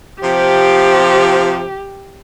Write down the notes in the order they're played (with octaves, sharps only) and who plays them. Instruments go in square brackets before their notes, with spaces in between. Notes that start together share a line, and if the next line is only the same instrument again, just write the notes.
[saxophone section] C3 F3 [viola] G4